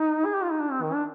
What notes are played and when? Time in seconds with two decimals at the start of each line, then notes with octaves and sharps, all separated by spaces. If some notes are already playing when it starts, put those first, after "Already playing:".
Already playing: D#4
0.25 G#4
0.34 G4
0.43 F4
0.51 D#4
0.60 D4
0.71 C4
0.82 D#3
0.94 D4